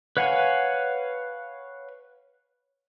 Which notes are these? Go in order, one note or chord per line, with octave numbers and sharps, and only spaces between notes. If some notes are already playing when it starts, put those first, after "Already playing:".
B4 C#5 F5 F#5 G#5